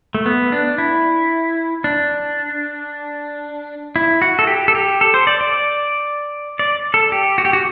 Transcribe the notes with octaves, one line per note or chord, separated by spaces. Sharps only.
A3
B3
D4
E4
D4
E4
F#4
A4
G4
A4
G4
A4
C5
D5
D5
D5
A4
G4
F#4
G4
F#4